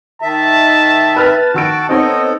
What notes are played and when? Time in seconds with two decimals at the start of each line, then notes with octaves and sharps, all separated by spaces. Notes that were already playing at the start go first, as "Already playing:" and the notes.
0.22 D#3 E5 A5
1.16 B4 A5 F6 A6
1.54 D#3 F#4 E6 D7
1.89 B3 C4 D#4 A4 C#5 D#5